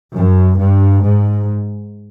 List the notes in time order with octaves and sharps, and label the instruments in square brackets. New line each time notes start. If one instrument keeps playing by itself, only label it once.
[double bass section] F#2
G2
G#2